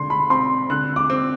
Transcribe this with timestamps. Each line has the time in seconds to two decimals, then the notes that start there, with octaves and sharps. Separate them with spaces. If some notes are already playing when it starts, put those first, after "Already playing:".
Already playing: D3 C6
0.10 B5
0.30 C4 C6
0.70 D3 F#6
0.96 D6
1.10 C4